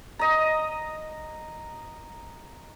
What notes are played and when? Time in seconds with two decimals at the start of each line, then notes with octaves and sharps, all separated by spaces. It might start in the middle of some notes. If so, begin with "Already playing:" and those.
0.19 D#5 A#5